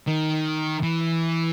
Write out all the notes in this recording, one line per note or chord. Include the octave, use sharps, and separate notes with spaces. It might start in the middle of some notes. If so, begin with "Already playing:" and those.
D#3
E3